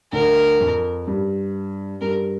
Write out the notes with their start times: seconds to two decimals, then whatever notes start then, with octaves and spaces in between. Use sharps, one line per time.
0.13 D2 D3 A#4
0.61 F2
1.08 G2
2.01 G2 A#4